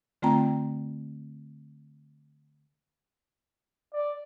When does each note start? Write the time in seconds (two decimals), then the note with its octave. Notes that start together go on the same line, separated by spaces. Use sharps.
0.22 D3 A3 C4 F4 G5 A#5
3.93 D5